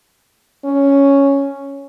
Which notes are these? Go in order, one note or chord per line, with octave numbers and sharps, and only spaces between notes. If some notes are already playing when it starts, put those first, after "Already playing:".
C#4